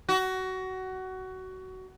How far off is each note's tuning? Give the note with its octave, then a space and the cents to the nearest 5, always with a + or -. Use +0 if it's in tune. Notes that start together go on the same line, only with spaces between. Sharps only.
F#4 +20